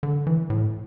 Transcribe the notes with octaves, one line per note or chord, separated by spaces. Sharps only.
D3
E3
A2